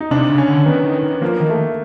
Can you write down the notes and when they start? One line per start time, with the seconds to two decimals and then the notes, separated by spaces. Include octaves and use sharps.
0.01 D#4
0.11 C3 D4
0.29 C#3
0.38 C#4
0.48 D3
0.66 D#3 B3
0.85 D#3
1.03 D#3
1.21 F3 A#3
1.40 D#3
1.50 A3